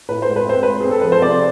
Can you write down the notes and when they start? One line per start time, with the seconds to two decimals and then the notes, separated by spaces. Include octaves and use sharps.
0.09 A2 B4
0.22 C5
0.28 G#3
0.36 B4
0.46 C4 C5
0.63 G#3 B4
0.81 C4 G#4
0.91 A4
1.01 F3 B4
1.12 C5
1.22 C3 D5